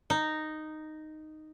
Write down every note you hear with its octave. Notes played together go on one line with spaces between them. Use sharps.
D#4